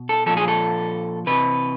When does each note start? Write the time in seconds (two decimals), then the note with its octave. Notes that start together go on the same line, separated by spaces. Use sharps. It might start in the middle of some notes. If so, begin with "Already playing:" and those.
Already playing: B2
0.09 A4
0.26 A#2 F3 A4
0.37 G#4
0.48 A4
1.26 C3 E3 B4